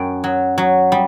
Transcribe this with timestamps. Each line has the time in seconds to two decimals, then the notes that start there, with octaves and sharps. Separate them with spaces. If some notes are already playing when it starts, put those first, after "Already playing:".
Already playing: F#2 G5
0.24 F#3
0.58 F#3
0.92 G3